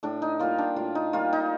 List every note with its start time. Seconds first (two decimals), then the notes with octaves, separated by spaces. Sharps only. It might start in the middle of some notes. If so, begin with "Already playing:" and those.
0.03 A2 D4
0.22 D#4
0.39 G3 A#3 F4
0.58 D4
0.76 A2 F4
0.95 D#4
1.13 G3 A#3 F4
1.33 D#4